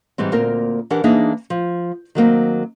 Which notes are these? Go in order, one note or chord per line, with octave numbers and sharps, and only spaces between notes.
G#2 E3 G3 C4
D2 A#2 A#3 C4 A#4
E3 D4 G4 A#4 F#5
E3 A#3 D4 D#4 G#4 E5
F3
D#3 F#3 A#3 C4